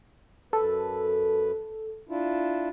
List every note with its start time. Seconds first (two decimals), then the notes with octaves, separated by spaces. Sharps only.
0.53 F#2 A4 B4
2.09 D4 E4 F4